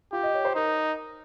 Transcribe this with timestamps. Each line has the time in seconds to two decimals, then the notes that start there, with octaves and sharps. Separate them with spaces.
0.12 F4 G4
0.23 D#5
0.34 C#5
0.45 C5
0.55 D#4 A#4